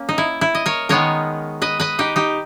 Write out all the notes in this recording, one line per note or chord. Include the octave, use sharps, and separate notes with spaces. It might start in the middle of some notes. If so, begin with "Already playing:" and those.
Already playing: A#3 C#4
D#4
E4
E4
D#5
A#4 C#5
D#3 G#3 B3 D#4 A#4 C#5
B4 D#5
B4 D#5
D#4 G4
D#4 G4